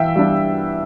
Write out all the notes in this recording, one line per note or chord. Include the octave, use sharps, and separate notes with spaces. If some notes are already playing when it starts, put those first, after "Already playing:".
Already playing: E3 E5 F5 G5
G3 D4